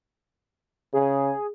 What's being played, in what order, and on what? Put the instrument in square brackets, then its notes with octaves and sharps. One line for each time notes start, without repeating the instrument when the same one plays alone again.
[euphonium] C#3 [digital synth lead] G#4